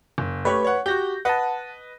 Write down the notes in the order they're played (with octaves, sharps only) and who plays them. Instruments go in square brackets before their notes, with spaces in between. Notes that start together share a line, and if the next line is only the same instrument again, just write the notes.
[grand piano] F#1
[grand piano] A3 G4 C#5 [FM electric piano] B4 B5
[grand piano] C#5 F#5
[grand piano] F#4 G4 [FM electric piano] G6 A#6
[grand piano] B4 D#5 [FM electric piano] F#5 A5